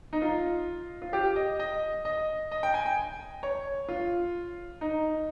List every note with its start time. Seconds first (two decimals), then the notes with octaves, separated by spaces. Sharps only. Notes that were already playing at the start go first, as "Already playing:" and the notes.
0.13 D#4
0.22 F4
1.02 F4
1.13 G4
1.36 D#5
1.59 D#5
2.05 D#5
2.51 D#5
2.63 G5
2.74 G#5
2.86 G5
3.43 C#5
3.89 F4
4.81 D#4